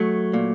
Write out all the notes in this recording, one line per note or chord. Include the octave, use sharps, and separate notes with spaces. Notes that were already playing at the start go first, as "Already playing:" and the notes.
Already playing: F#3 A3
A#2